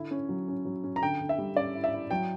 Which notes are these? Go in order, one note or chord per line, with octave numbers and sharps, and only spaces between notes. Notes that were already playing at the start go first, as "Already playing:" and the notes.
Already playing: D3 E4
C#4
F#3
C#4
F#3
C#4
A#5
D3 G5
D3
E5
G3
C#4 D5
E4
E5
E4
F#3 G5